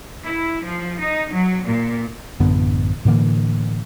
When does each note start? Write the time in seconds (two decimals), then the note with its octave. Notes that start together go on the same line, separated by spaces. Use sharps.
0.25 E4
0.64 F3
1.00 D#4
1.33 F#3
1.66 A#2
2.40 A1 F#2 D3 B3
3.05 A2 D3 E3 A#3